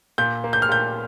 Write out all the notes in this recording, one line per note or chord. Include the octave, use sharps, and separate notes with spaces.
A#2 G6
A#3
G6
F6
A#2 G6